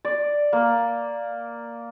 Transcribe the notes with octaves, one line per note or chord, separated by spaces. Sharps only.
D5
A#3